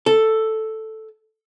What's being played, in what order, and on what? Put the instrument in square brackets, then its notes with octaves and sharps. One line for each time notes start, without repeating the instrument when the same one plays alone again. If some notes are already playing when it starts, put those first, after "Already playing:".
[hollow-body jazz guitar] A4